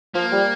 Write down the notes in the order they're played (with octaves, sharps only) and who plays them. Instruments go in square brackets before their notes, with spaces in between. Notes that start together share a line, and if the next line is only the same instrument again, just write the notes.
[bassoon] F3 [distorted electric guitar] A#3
[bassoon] G3